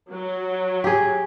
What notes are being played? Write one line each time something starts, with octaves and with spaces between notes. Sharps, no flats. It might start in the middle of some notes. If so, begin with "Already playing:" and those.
F#3
G4 G#4